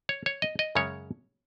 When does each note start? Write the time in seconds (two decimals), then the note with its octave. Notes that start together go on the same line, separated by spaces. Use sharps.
0.09 C#5
0.26 C#5
0.42 D#5
0.59 D#5
0.75 F#2 C#3 G#3 C#4 C#5